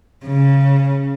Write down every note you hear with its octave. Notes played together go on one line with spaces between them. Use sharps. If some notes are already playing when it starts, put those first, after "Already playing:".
C#3